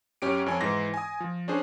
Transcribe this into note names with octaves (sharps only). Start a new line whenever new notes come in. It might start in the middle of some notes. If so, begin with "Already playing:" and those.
F#2 C#4 G4 D7
F2 C#5 G#5
G#2 E3 C6 A#6
G#5 D#6
F3
C#4 D4 G#4 C5